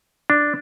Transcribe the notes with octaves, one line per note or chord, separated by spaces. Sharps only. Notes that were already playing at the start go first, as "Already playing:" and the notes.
D4